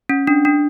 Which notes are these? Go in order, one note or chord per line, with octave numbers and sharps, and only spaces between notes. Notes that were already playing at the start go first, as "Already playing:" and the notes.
C#4
D4
D4